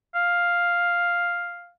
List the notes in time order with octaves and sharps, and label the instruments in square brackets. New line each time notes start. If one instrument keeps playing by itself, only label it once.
[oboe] F5